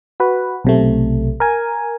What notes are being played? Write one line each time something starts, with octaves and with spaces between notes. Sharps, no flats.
F#4 B4
B1 C3 A3
A#4 G#5